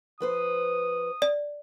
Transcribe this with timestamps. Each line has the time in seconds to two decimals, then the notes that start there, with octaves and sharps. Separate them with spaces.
0.20 F3 B4 C5 D#6
1.22 D5